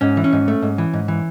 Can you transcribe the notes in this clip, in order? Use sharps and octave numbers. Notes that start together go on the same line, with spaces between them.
G#2 C#4
E3
C#4
G#2
A3
G#2
E3
G#2
E3